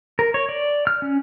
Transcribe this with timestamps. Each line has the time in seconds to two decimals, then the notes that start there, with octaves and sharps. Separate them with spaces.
0.19 A#4
0.34 C#5
0.49 D5
0.87 F6
1.02 C#4